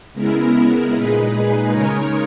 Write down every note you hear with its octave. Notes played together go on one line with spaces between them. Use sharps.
C#3 G#3 B3 E4 A#4
A#2 G#3 D#4 G#4 B4
C#3 G#3 D#4 A#4 C#5